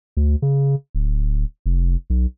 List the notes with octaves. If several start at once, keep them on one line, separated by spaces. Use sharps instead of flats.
D2
C#3
D1
F1
B1